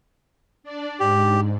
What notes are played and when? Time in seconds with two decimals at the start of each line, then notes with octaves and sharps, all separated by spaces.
0.63 D4 D5
1.00 G#2 G4